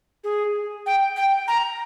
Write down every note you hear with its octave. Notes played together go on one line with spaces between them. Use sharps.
G#4
G5
G5
A#5